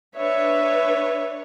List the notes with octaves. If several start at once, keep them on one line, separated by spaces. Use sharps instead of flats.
D4 B4 C#5 E5